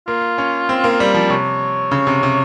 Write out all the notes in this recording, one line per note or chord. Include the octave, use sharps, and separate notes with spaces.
A#3 F4
C#4
C4
A#3
G3
F3
C3 C#5
C#3
C3
C3